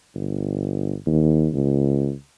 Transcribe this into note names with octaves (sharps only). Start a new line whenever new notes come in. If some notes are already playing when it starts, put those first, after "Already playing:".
G1
D#2
C#2